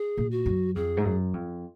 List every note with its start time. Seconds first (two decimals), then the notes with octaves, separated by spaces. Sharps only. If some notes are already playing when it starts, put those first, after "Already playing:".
Already playing: G#4
0.18 A#2
0.31 F#4
0.46 F#2
0.75 F2 G#4
0.97 G#2
1.05 F#2
1.34 F2